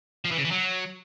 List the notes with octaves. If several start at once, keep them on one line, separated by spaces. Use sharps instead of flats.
F3
E3
C#3
E3
F#3